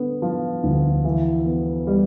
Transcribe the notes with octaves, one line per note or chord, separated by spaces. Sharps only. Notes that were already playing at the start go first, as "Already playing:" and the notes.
Already playing: D3 B3
F3
D2
E3
B3
G3